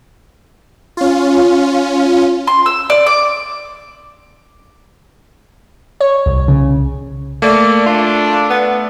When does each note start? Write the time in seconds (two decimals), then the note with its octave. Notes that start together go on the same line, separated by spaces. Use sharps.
0.97 C#4 F4
2.47 C6
2.66 E6
2.90 D5
3.06 D6
6.01 C#5
6.26 C2
6.48 C#3
7.42 A3 A#3 D5
7.86 D4 F4
8.50 B3